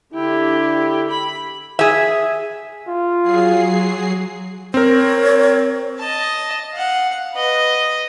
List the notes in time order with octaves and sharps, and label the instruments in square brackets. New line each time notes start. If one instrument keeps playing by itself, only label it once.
[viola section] D3 G4 [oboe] E4
[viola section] B5
[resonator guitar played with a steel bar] G#4 E5
[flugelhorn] F4
[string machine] F#3 G#4 C7
[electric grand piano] C4 A#4 [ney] C#5
[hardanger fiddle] D#5 A5
F5 F#5
B4 D#5